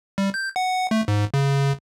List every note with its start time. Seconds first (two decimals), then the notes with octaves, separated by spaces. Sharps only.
0.18 G3
0.34 G6
0.56 F#5
0.91 A3
1.08 G#2
1.34 C#3